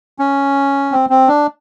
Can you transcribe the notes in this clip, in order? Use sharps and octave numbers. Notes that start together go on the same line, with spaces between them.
C#4
C4
C4
D4